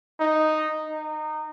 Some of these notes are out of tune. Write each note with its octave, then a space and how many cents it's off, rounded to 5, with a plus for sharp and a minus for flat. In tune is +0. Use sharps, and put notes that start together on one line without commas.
D#4 -5
D#4 -20